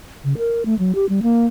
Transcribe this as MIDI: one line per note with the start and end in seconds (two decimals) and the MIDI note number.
0.24 0.37 49
0.38 0.63 70
0.66 0.77 57
0.79 0.95 54
0.95 1.06 67
1.09 1.20 55
1.22 1.46 58